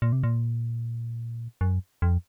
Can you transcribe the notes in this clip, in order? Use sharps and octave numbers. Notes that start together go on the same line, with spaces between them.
A#2
C3
A#2
F#2
F2